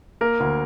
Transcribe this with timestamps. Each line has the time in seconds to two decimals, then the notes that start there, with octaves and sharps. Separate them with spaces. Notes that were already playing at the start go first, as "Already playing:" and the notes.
0.21 A#3 A#4
0.40 D2